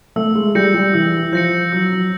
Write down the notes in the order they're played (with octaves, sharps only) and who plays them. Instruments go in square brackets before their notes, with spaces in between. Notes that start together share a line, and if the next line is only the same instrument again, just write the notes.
[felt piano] A3 [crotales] E6
[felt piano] G#3
[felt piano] G3 [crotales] G6 A#6 C#7
[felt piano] G3
[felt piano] E3 [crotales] E6
[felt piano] F3 [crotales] G6 A#6 C#7
[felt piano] F#3 [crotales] E6
[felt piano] F#3